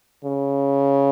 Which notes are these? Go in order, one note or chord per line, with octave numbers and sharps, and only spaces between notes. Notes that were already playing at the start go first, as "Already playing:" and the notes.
C#3